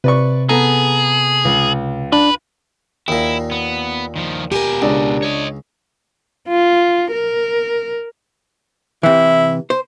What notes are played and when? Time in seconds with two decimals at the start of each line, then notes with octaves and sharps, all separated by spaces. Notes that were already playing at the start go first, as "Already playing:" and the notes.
0.04 C3 B4 D5 C#6
0.49 B3 G#4 A4 A#5
1.45 C#2
2.12 D4 B4
3.08 D#2 A#2 E4
3.52 B3
4.16 D#3 F3
4.52 B2 G4 A#4 G#5
4.82 C#2 D4
5.23 C#5 D#5
6.48 F4
7.12 A#4
9.03 C3 E3 E4
9.70 C5